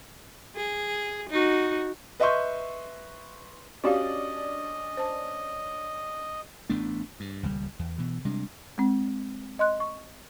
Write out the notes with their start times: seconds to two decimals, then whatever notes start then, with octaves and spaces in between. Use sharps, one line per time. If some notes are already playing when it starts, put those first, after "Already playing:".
0.56 G#4
1.30 D#4 F#4
2.20 B4 D#5 E5 C6 C#6 G6
3.84 C#4 D4 F#4 G4 D5 D#5 F5
4.97 C5 A5
6.69 A1 A3 B3 D4
7.20 G2
7.43 D#1 C#2 G3
7.79 E2
7.98 B2 E3
8.25 C3 G3 G#3 D4
8.78 G#3 C4
9.59 D#5 C6 F#6
9.80 C#6